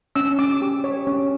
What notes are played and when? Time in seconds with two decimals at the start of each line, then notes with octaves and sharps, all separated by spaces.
0.16 C#4 E6
0.39 C#4 D6
0.62 G4
0.84 C#5
1.07 C#4